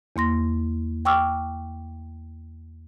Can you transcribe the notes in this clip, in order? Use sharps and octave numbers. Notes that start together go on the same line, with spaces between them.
E2 A#3 C6 A#6
G5 C#6 D6 E6 F6